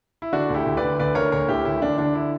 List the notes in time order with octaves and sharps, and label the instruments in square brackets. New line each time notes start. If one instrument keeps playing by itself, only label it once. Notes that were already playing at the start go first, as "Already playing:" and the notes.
[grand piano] E4
D3 D4 F#4
D2
E4 G4
D2
B4 D5
D3
D2 B4 D5
D3 A#4 C#5
D2 A#4 C#5
D2 E4 G4
D2 E4
D3 D4
D3 D4
E4